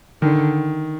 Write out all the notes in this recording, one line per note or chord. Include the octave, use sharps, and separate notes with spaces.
D3 D#3